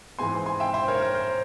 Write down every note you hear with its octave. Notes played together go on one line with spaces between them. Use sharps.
G#2 E3 G#3 C4 G#5 C6
G#5 C6
E5 G5
C5 E5
A#4 C#5
A#4
C5